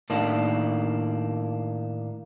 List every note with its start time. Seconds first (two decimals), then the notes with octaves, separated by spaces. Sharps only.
0.10 A2 D#3 A#3 D4